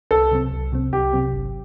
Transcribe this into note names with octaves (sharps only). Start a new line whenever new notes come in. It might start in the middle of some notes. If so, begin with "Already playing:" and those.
C2 A4
C3 F#3 C4
C2
C3 F#3 C4
C2 G4
C3 F#3 C4
G1